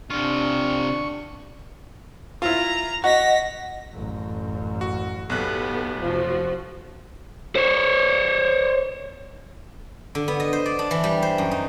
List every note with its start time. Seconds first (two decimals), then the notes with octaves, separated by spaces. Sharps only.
0.10 C3 D4 F4 C#6
2.42 E4 F4 A#5
3.04 F#4 D#5 F#5 A#6 B6
3.93 A1 F#2
4.81 F#4
5.30 B1 B3 G4 A4 F#6
6.00 F1 F3 F#4
7.56 C5 C#5
10.15 D3
10.28 B3
10.40 D#5
10.53 C5
10.66 D5
10.79 D4
10.91 E3
11.04 G3
11.23 C5
11.38 F#2
11.51 D#4